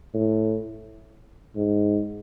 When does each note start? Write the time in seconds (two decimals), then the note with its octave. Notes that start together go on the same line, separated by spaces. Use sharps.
0.13 A2
1.56 G#2